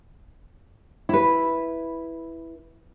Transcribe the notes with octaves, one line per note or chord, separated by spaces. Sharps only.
E4 B4